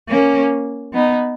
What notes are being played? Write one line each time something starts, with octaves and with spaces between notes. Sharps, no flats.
A#3 C#4
B3 D#4